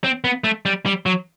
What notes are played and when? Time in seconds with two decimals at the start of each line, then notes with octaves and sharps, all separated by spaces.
0.04 C4
0.24 B3
0.44 A3
0.66 G3
0.86 G3
1.06 F#3